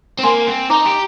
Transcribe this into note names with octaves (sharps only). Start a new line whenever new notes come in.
C4
A#3 G#5 C6
C4
D#4 A#5 D6
G4